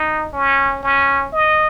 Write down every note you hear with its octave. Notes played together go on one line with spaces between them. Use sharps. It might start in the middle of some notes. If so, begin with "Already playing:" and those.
Already playing: D#4
C#4
C#4
D#5